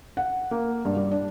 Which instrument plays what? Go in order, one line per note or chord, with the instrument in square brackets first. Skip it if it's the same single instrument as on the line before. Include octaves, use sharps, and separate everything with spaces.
[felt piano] F#5
A#3
G2
G3
D4